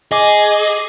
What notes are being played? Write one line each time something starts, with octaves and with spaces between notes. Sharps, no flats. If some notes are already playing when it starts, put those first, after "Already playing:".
G#4 D#5 D6